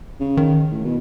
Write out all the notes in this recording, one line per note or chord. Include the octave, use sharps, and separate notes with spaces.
C#3
D#3
A2
B2